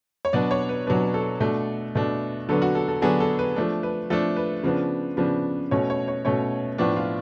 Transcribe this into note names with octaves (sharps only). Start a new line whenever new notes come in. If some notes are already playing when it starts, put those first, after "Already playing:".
C#5
B2 F#3 B3 D4 D5
C#5
B4
B2 F#3 B3 D4 B4
A4
B2 A3 D4
B2 A3 D4
D3 F#3 B3 D4 A4
F#4
A4
A4
D3 F#3 B3 D4 G#4
A4
B4
F3 A3 D4
B4
F3 A3 D4 A4
B4
C#3 F3 B3 D4
C#3 F3 B3 D4
B2 A3 C#4 C#5
C#5
C#5
B2 A3 C#4 C#5
A2 F3 B3 D4 D5
F4